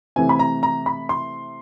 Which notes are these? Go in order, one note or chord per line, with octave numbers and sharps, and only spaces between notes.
C3 E3 A3 C4 G#5
B5
A#5
A#5
B5
C6